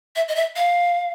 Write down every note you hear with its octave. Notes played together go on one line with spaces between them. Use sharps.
E5
D#5
E5
F5